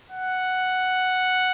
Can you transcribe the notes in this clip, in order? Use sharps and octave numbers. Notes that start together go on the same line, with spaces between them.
F#5